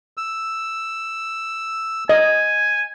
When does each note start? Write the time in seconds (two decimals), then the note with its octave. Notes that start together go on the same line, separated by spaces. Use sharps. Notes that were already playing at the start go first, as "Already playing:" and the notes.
0.17 E6
2.09 D#5 G#5